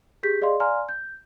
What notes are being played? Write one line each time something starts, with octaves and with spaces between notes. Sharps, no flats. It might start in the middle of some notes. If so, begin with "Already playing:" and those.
G4 G#4 G6 B6
G#4 D5 D#5 F5 C6
D5 F5 G#5 A#5 C6 F6
G6